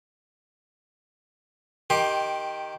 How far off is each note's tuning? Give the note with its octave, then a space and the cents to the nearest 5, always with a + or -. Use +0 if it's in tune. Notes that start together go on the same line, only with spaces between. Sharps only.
D#3 +0 G4 +0 C6 +20